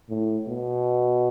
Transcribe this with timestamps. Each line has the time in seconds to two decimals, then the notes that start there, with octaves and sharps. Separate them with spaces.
0.09 A2
0.48 B2